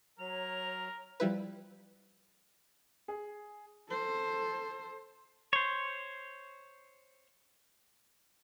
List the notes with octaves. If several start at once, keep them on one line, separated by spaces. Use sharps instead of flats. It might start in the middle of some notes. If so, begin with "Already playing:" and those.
F#3 A#4 C#5 F7
F3 G3 E4 B4
G#4
A4 C5
C5 C#5